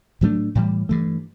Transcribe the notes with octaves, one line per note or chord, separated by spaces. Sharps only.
A2 F#3 A3 D4
A2 E3 G3
G2 E3 A3